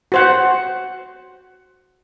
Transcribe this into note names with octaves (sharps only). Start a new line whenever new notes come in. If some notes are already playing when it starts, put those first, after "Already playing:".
F#4 C5 F#5